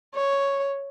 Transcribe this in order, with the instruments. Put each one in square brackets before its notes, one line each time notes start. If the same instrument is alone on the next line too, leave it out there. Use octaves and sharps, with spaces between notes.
[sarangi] C#5